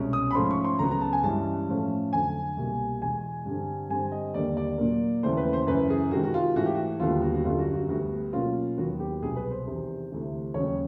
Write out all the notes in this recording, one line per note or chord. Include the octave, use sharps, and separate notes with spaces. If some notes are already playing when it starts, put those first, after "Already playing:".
Already playing: C2 B2 G#3 C#4
D#6
B5
G#2 F3 A3 C#4 C6
C#6
C6
C#2 C#3 F#3 B3 A#5
A#5
A5
G#5
G2 E3 G#3 C#4 A5
A2 F3 A3 C#4
F2 D3 F#3 G#5
C2 B2 G3 A#3
E2 B2 G#3 G#5
G2 D3 G3 C4
G2 D3 G3 C4 G#5
D#5
D#2 D3 G3 A#3 D5
D5
A#2 F#3 A#3
D#2 C#3 E3 A3 C5
B4
C5
F#2 C#3 E3 B4
G#4
C3 D#3 G#3 F#4
F#4
F4
G#2 E3 A3 F#4
G4
F#4
D#2 D3 G3 B3 F4
F#4
F#4
F#2 D3 G3 F4
F#4
F#4
D2 D3 G3 B3 F#4
B2 F#3 A#3 C#4 F4
D#2 D#3 F#3 B3 F#4
G4
C2 B2 F#3 B3 G#4
B4
C5
E2 C3 D#3
D2 C3 E3
D#2 C#3 F#3 C#5